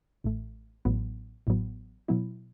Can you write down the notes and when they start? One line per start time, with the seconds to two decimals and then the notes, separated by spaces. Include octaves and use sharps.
0.24 A1 A2 A3
0.85 A1 A2 F#3 B3
1.47 A1 A2 F#3 B3
2.08 B2 F#3 B3 E4